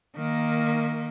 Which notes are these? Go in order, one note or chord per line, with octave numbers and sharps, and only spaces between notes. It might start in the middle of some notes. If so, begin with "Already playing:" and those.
D#3 A#3